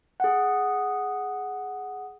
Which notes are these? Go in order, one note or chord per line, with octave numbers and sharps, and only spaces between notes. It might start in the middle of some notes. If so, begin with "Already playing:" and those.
G#4 F#5